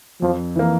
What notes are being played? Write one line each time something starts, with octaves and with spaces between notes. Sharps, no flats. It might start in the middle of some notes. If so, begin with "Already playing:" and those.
F2 F3
E3 A#3